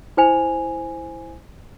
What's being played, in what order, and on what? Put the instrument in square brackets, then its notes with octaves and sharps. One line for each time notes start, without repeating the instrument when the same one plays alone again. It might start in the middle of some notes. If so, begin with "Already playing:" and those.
[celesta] E4 C5 G#5 F7